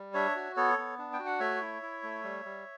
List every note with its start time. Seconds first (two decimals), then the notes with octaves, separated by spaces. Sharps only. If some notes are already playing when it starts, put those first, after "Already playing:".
Already playing: G3
0.14 D4 C#5 E5
0.35 F#4
0.56 B3 A4 C#5
0.78 B3
0.98 D4
1.13 G5
1.19 F#4
1.26 F#5
1.40 A3 C#5 E5
1.61 E4
1.82 E4
2.03 A3
2.24 G3
2.45 G3